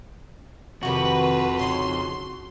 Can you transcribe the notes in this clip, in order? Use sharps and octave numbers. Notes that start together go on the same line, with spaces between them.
F2 C3 D#3 F#4 G4 B4
C#3 D#4 C6